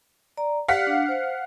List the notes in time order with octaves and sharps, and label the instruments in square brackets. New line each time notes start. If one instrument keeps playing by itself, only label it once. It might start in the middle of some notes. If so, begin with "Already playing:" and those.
[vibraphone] D5 A#5
[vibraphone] G4 D5 [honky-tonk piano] F5 F#5 B6
[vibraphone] D4
C5